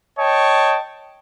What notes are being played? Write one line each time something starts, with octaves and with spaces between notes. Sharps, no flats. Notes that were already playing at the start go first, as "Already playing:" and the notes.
C#5 D#5 G5 A5